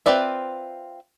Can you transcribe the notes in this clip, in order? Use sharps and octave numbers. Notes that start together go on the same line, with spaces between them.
C4 F4 B4 D5 E5